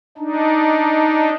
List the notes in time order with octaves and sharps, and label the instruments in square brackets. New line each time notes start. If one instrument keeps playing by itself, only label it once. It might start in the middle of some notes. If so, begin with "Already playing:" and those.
[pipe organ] D4 D#4